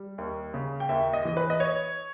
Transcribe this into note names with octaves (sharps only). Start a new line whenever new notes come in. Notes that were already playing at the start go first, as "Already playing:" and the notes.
Already playing: G3
D#2
C#3
G5
D#2 E5
D#5
E3
B4
D#5
C#5